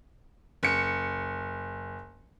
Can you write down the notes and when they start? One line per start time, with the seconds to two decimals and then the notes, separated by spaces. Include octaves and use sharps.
0.63 F#1 C#7